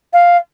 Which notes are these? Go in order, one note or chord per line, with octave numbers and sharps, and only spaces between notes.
F5